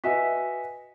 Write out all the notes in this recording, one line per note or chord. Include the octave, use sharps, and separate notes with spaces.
F#4 B4 D#5 E5 G#5 B6